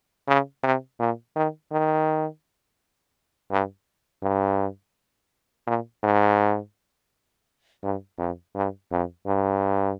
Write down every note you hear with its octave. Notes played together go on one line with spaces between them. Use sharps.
C#3
C3
A#2
D#3
D#3
G2
G2
A#2
G#2
G2
F2
G2
F2
G2